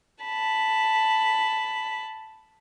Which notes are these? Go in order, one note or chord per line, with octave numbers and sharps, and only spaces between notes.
A5 B5